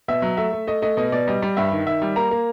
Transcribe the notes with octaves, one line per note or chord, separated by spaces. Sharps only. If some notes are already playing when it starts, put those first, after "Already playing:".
B2 E5
F#3
A3 E5
A3
A3 D#5
A3 D#5
B2 D#5
B2 D5
G3 D#5
G3
G2 E5
D#3
D#3 E5
G3
A#3 A#5
A#3